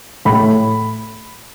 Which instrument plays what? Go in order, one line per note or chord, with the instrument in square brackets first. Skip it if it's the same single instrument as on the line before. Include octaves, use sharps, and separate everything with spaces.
[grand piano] A2 A3 B5